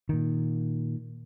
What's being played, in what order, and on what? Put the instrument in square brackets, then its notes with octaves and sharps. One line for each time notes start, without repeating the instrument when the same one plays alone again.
[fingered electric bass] A#2 D#3